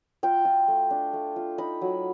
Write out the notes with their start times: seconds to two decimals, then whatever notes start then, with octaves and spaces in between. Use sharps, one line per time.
0.23 F4 G5
0.45 F4
0.68 A3
0.91 D4
1.13 A3
1.36 F4
1.58 D#4 B5
1.81 F#3